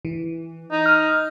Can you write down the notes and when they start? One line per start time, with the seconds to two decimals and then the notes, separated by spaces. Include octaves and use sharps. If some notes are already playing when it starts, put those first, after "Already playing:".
0.05 E3
0.72 D#4
0.86 F6